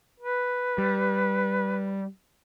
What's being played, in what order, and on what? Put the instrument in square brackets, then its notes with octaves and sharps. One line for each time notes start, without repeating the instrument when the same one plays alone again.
[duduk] B4
[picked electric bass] G3